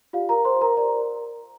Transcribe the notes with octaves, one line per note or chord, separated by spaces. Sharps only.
F4 G4 D5 F5
A#4 A#5
C5 C6
A#4 A#5
G4 A#4 D5 A#5